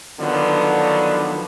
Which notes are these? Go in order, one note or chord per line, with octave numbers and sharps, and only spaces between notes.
D3 D#3 F3 F#3 B3 D4